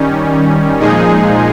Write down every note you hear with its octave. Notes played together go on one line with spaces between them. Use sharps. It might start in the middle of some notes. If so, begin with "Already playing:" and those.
Already playing: D#3 G3 C#4
A#2 F3 G#3 D#4 G#4